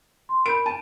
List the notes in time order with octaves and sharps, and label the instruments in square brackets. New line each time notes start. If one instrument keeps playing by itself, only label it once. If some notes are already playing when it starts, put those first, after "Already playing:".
[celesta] C6
[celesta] A#4 B5 G6 [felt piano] D7
[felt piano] A5 [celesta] D#7